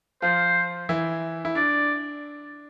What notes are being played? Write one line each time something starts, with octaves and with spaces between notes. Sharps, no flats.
F3 F4 C5
E3 E4
E4
D4 D5